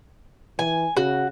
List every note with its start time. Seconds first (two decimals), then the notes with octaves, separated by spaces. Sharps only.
0.59 E3 G#5
0.97 C#3 F#4